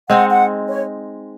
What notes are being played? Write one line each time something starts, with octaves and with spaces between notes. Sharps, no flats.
G#3 C4 D#4 F#5
F#5
C#5